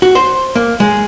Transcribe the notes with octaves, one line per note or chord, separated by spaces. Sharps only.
F#4
C5
A#3
G#3